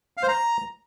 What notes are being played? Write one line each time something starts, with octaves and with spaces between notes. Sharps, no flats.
F5
C5
A#5